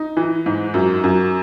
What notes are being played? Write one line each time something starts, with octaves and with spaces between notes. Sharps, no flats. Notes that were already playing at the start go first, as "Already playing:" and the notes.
Already playing: D#4
E3
G#2
F#2
F#2